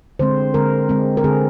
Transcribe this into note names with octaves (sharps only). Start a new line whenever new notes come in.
D3 G#3 C4 C5
D3 G#3 C4 A#4
D3 G#3 C4
A#4
D3 G#3 C4 G#4